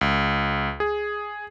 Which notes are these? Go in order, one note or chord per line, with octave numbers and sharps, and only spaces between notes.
C#2
G#4